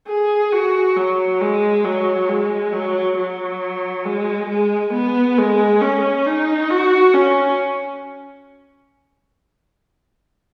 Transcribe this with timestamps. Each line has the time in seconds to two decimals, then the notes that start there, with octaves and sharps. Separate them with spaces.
0.08 G#4
0.52 F#4
0.96 F#3
1.41 G#3
1.84 F#3
2.29 G#3
2.73 F#3
3.17 F#3
4.05 G#3
4.49 G#3
4.93 B3
5.37 G#3
5.81 C#4
6.26 D#4
6.70 F#4
7.14 C#4